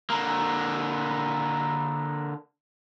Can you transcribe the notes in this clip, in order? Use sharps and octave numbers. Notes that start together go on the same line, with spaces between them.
D3 A#3